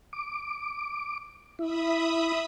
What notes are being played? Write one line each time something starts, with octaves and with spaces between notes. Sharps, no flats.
D6
E4 E5 B5 D#6